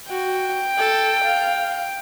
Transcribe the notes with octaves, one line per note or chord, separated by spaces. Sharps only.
F#4 G5
A4
F5